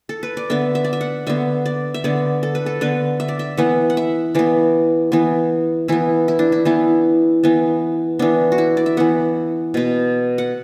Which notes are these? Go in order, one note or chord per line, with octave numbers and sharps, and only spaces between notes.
A4
B4
D5
D3 B3 E5
E5
D5
E5
F#5
D3 B3 E5
D5
E5
D3 B3 D5
A4
B4
A4
D3 B3 B4
E5
D5
E5
E3 B3 F#5
F#5
E5
E3 B3 D5
E3 B3
E3 B3 E4
E4
D4
E4
E3 B3 E4
E3 B3
E3 B3 D4
F#4
E4
D5
E5
E3 B3 F#5
B2 B3
F#5